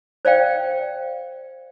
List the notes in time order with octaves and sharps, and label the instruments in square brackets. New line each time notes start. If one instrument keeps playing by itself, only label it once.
[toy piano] C5 D5 F5 G5